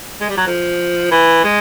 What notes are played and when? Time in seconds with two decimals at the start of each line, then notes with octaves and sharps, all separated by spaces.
0.20 G#3
0.29 G3
0.37 F#3
0.47 F3
1.11 E3
1.44 G#3